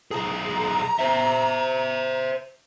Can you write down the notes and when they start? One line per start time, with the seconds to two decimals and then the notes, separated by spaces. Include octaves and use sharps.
0.11 B1 G#4 A#5
0.99 C5 E5